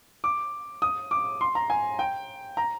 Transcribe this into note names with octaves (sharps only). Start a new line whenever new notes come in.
D6
D#6
D6
C6
A#5
G#5
G5
A#5